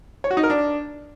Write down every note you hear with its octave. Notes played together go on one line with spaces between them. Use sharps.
C#5
F#4
D#4
A#4
D4